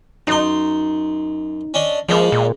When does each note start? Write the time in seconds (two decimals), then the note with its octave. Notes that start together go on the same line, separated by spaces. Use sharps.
0.27 F#2 D#4 C6
1.74 C#4 D4 D#5
2.09 C#3 F3 G#3 A#3
2.32 A#2